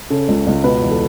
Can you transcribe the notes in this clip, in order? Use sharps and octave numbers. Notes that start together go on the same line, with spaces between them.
C#3 A4
C#2
C#2
B2 B4
E2
A4